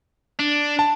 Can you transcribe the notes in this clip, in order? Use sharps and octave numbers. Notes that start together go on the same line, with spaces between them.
D4
A5